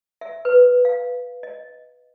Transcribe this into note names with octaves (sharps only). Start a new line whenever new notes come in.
E5
B4
F5
D#5